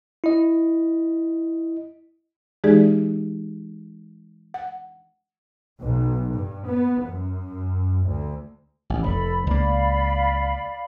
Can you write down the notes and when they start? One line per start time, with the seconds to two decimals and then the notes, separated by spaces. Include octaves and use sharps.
0.24 E4 D#5
2.64 E3 G#3 D#4 G4 G#4 D5
4.54 F#5
5.80 B1
6.33 G2
6.67 B3
7.06 F#2
8.07 D2
8.90 A1
9.03 F1 A4 B5
9.47 C#2 A#3 D5 F5 B5